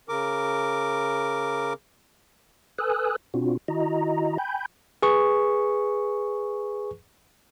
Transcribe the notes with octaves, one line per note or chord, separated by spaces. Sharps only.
C#3 A#4 D6
A4 B4 G#5 D#6 E6 F#6
B2 C4 D4 F4 F#4
D#3 E4 F#4 D#5 A#5
G5 G#5 B5 G6
G#4 B4 C#6